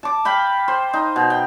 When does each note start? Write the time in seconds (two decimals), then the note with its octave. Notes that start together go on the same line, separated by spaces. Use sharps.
0.03 A5 D6
0.25 F5 G5 B5
0.68 C5
0.93 D#4
1.16 B2
1.30 G5